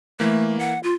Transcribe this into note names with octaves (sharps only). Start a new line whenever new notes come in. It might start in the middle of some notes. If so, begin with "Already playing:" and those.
E3 A3 A#3
F#5
F4